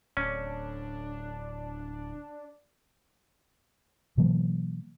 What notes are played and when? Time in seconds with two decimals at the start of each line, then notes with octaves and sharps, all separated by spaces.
0.17 D1 C#4 D4
4.17 B2 E3 F#3 A#3